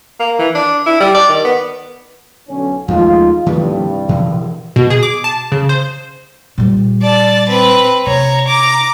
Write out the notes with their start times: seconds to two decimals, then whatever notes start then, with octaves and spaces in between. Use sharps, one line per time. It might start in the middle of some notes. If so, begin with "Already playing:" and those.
0.20 A#3
0.39 E3
0.55 D4
0.86 E4
1.00 G3
1.14 D5
1.29 D#3
1.45 B3
2.48 B1 D3 C#4
2.88 D#2 F3 G#3 A3 D#4 F4
3.46 C2 G2 D#3 F3 A3
4.09 B2 E3 F3
4.76 B2
4.90 G#4
5.03 D6
5.24 A5
5.52 C#3
5.69 C5
6.58 A#2 G3
7.02 D5 A5
7.49 C4 B4
8.06 C3 C#5 A#5
8.47 A#5 D6